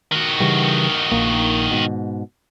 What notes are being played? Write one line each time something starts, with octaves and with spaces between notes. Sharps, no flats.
D#3 F#4
C#3 E3 G3
A#1 A#3
G#2 B2